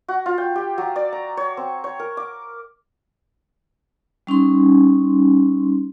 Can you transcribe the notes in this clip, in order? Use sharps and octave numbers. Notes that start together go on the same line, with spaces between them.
F#4
F4
G5
G4
F#3
D5
A#5
C#5
C4
C#5
A#4
D6
G3 C#4 D#4 C6